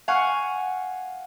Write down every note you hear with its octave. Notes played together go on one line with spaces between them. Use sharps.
F5 F#5 G#5 C#6